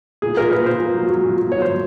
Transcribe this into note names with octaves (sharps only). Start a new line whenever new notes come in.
A#2 G#4
A#2 A#4
A#2 B4
A#2 C5
A#2
F#3
F#3
A#2
A#2
F#3 C#5
F#3 C5